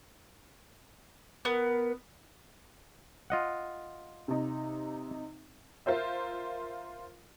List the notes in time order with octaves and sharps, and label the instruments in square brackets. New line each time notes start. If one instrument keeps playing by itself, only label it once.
[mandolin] B3 [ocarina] A#4
[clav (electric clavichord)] F4 D#5 F#5
[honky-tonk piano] C3 D#4
F4 A#4 C5 E5